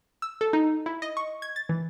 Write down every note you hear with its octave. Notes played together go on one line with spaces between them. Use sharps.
E6
A4
D#4
E4
D#5
C#6
G#6
A6
E3